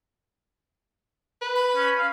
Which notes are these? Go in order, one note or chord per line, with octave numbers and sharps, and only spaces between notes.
B4
B5
C#4
F5